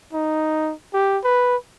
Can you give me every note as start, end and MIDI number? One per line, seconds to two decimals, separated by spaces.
0.13 0.73 63
0.93 1.18 67
1.24 1.56 71